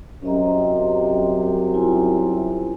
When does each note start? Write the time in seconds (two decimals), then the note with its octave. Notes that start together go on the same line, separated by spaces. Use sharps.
0.23 C2 F#2 C3 C#4 D#5 A#5
1.74 E4 F4 G#5